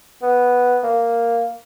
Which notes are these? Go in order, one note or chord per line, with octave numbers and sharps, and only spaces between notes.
B3
A#3